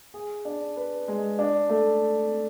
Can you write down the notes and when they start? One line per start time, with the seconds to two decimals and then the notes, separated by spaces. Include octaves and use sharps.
0.14 G#4
0.45 D4
0.77 B4
1.08 G#3
1.39 D4
1.69 A3